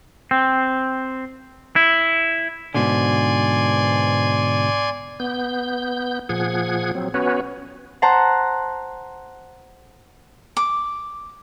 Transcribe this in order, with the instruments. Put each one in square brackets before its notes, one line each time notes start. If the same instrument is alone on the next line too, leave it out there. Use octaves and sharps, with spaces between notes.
[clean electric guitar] C4
E4
[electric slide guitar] G#2 B2 D3 [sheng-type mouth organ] D5 G#5 C6
[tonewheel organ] B3 G6
A#2 F3 G#4 F#5 G#6
F#3 C4
B3 C#4 F#4 B4 C#5
[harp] C5 F#5 A5 A#5
[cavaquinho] D6